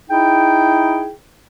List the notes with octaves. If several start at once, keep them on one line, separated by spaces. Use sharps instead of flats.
D#4 E4 G#4 G5